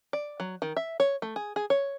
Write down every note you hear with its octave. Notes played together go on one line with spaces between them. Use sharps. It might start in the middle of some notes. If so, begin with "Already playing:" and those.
D5
F#3
D#3
E5
C#5
A3
G#4
G#4
C#5